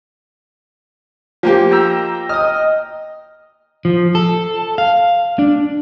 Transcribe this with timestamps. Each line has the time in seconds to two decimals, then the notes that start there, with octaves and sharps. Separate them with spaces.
1.43 F3 A#3 G4
1.71 G5 A#5 E6
2.29 D#5 D#6 F6
3.85 F3
4.15 A4
4.78 F5
5.39 D4